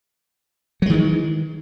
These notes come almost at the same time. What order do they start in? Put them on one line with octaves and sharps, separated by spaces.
F#3 G#3 D#3 E3